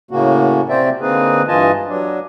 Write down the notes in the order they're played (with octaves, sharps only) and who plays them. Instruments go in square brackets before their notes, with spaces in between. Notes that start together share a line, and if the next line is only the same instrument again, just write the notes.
[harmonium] A2 C#3 A#3 F#4
C3 C4 C5 D5 E5 G5
D3 A#3 C4 D#4 G#4 B4
G2 E3 F4 D#5 G#5 A5
F#3 D4